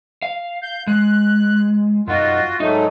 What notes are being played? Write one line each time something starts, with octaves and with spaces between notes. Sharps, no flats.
F5
G6
G#3 F#6
F#2 D#4 F4 F#4
G#2 F#3 A3 D#4